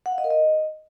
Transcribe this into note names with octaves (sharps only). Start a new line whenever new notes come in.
F#5
F5
D#5
A#4
D#5